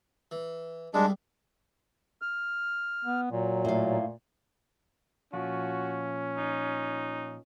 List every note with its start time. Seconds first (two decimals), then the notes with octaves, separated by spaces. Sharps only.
0.31 E3
0.94 C2 G#2 G3 G#3 D4
2.22 F6
3.05 B3
3.31 A#2 F#3
3.65 A2 F5
5.33 A#2 F3 C#4 F#4
6.37 D#4